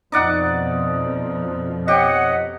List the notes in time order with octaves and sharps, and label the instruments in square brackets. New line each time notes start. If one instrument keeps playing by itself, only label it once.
[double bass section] F2 B2 F3 [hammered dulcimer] D#4 D5 F#5
[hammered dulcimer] G4 [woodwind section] C#5 D#5 F#5